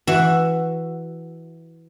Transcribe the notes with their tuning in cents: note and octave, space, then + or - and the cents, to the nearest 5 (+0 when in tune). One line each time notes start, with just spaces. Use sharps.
E3 +0 F#4 +0 E5 +5